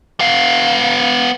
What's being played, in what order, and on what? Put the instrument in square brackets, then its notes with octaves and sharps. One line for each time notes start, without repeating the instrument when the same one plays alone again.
[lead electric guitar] B3 F5